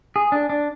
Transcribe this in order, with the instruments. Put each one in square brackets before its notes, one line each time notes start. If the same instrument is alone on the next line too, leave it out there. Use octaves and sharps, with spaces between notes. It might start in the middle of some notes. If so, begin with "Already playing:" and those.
[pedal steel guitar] G#4
D4
D4